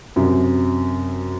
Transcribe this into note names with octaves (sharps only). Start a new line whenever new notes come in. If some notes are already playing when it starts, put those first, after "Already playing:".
F#2 C3